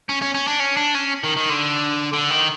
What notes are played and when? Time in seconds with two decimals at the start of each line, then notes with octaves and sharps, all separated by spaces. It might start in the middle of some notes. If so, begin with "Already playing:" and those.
0.09 C#4
0.22 C#4
0.35 C#4
0.47 D4
0.60 C#4
0.77 D4
0.95 C#4
1.23 D#3
1.37 D#3
1.49 D3
2.13 D3
2.30 D#3